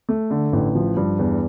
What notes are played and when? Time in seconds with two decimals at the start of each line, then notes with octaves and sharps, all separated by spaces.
0.09 A3
0.31 D3
0.53 A1
0.75 F3
0.97 G2
1.19 E2